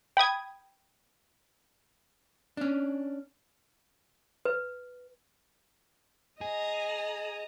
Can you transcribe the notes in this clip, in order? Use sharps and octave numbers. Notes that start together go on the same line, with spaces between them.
G5 B5 D#6 G#6
C#4 D4
B4
G#4 D#5 A#5